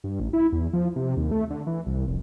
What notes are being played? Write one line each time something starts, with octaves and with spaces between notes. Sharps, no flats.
G2
A1
E4
E2
F3
C3
D#2
A3
D3
E3
C2
F1